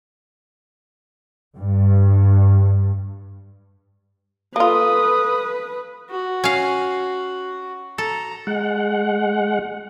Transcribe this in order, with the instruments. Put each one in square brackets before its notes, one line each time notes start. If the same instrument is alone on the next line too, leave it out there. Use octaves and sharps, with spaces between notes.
[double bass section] G2
[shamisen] A#3 F4 [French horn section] A4 [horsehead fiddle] B4 [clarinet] D#6
[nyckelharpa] F#4
[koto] C#4 F5
[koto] A4 [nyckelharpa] A#5
[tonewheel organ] G#3 F#5